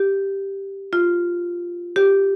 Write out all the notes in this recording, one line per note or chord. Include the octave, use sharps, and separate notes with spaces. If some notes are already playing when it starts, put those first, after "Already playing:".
Already playing: G4
F4
G4